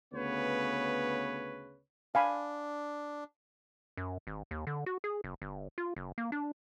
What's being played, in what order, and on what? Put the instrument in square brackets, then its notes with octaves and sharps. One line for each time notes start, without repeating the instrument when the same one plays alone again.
[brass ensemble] D2 C#3 B3 B4 C#5
[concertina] D4 [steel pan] F5 G#5 B5
[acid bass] F#2
G#1
D#2
D3
F#4
G#4
F#1
G1
F4
F#1
A#3
D4